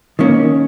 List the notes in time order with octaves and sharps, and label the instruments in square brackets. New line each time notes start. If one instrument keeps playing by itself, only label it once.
[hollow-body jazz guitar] D#3 A#3 C#4